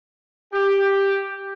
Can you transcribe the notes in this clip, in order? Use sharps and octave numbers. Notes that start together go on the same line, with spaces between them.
G4